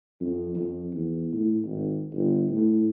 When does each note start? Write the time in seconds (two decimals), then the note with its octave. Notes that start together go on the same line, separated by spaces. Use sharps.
0.21 F2
0.55 F2
0.93 E2
1.33 A2
1.65 G#1
2.13 G1
2.50 A2